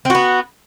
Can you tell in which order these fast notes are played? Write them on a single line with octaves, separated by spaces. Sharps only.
C4 F#4 B3